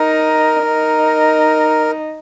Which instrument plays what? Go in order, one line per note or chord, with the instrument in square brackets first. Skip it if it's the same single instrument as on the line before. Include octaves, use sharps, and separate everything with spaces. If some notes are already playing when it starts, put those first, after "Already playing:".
Already playing: [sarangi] D#4 [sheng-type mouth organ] A#4
[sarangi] D#4